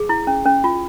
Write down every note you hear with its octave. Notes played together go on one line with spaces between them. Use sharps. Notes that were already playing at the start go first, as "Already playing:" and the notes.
Already playing: G#4
E4
C#4
C#4
F4